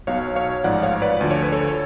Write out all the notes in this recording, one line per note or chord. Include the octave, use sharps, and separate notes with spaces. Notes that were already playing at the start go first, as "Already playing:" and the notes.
B1 B2 F#3 C#5 F5
C#5 F5
A1 G#2 F3 D5 F#5
C#5 F5
B4 D5
D2 D3 F3 D5
C#5
B4
A4 C#5